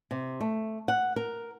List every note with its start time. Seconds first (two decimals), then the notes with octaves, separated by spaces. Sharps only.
0.11 C3
0.41 A3
0.88 F#5
1.16 A#4